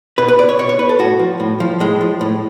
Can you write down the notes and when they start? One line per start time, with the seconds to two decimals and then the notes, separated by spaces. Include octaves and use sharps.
0.18 B2 B4
0.28 B4
0.39 D5
0.49 C#5
0.59 B2 C#5
0.69 C#5
0.79 B4
0.89 A4
0.99 A2 F#4
1.19 F3
1.40 A2
1.60 F3
1.80 A2 G#3
2.01 F3
2.21 A2